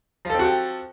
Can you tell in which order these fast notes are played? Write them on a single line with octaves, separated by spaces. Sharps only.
F3 A4 C4 F#4 G4